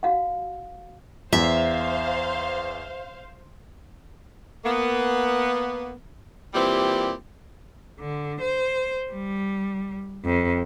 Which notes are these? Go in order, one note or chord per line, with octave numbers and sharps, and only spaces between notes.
F#4 F5 F#5
E2 C5 E5 F5
A#3 B3
A#2 E3 G3 C4 G4
D3
C5
G3
F2